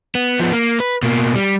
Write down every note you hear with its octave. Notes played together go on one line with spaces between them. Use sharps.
B3
F3 B3
A#3
B4
B2 A#3
G3